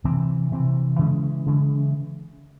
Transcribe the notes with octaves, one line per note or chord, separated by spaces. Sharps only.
C3 E3 C4
C3 E3 C4
C#3 E3 G#3 C#4
C#3 E3 G#3 C#4